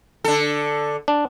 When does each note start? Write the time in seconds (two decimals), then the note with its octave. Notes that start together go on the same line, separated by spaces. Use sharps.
0.24 D3 A4
1.08 D4